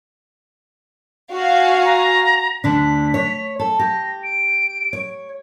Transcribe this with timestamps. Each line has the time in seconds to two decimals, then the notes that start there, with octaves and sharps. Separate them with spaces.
1.31 F#4 F5 G#5
1.85 A#5
2.64 D2 D3 D4 B6
3.14 C#5
3.59 A4
3.79 G4 A#6
4.24 D7
4.93 C#5